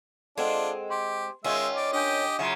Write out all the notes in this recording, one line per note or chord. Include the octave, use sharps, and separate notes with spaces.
G#3 C4 D4 F4 A4 F#5
G4 C6
D#3 G#3 C#4 F4 E5 F5 G#5
D5
D4 G4 D#5 G#5 G6
C#3 F#3 F4 F#4 E5 F#5